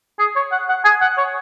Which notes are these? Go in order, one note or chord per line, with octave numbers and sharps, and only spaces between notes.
G#4
C#5
F#5
F#5
G#5
F#5
C#5